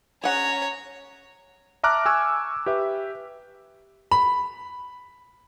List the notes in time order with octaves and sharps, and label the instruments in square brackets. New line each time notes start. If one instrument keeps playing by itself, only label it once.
[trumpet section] C#4 A#5 [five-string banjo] G#4 F#5 [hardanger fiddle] C#5
[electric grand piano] E5 A5 A#5 D6 F6 F#6
G#5 C#6 E6 G#6
G4 B4 E5
[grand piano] B5